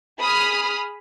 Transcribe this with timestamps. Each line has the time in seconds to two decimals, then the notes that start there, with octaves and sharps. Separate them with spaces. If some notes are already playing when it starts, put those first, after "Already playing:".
0.20 G#4 B5 D#6 F6